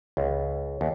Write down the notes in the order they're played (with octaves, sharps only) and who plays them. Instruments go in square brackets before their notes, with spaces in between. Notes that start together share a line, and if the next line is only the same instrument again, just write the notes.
[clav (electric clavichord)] C#2
D#2